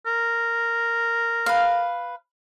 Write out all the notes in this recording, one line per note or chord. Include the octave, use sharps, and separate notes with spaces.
A#4
B4 F5